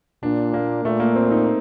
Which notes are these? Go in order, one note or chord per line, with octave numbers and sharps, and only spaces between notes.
A#2 D4
A#3
A#2 A3
A#3
C4
D#4